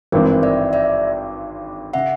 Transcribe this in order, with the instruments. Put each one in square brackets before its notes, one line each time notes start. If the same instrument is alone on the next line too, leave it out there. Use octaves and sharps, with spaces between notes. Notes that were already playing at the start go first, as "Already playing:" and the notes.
[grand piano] G#1 G2 E3 G#3 C4 [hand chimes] A#4 C5
[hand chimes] D5 E5
D5 E5
[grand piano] C#3 [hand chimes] E5 F#5